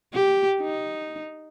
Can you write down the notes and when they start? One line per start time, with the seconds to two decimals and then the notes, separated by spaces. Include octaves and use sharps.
0.14 G4
0.61 D#4